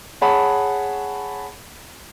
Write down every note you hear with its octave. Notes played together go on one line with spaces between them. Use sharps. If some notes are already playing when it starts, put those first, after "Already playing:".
G#4 C#5 F#5 A5 B5